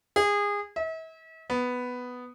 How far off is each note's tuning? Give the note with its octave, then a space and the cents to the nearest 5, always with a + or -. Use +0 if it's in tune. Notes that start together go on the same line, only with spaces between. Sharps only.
G#4 -25
E5 -40
B3 +5